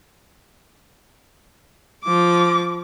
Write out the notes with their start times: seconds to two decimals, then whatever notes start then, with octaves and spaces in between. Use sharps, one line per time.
2.04 F3 D6